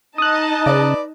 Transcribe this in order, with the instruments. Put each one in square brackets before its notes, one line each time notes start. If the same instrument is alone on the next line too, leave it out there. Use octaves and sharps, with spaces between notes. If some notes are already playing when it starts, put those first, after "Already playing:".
[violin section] D#4 D#5 A5 [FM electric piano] D#6 F#6
[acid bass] C#3 [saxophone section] B4 D5